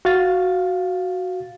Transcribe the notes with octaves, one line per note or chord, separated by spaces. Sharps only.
F#4 F5 A6